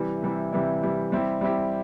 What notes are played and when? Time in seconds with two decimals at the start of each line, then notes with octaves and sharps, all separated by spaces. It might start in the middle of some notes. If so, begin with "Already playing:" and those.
Already playing: C3 E3 G3 E4
0.22 C3 E3 G3 E4
0.53 C3 E3 G3 E4
0.83 C3 E3 G3 E4
1.12 G3 C4 E4 G4
1.41 G3 C4 E4 G4